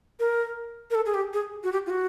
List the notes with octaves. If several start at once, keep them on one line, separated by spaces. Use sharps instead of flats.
A#4
A#4
A4
G#4
G4
G#4
F#4
G4
F4
F#4